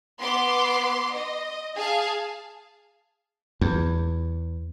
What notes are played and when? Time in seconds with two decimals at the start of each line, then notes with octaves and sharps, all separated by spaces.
0.19 B3 C6 D6
1.14 D#5
1.75 G#4 F5 A5
3.61 E2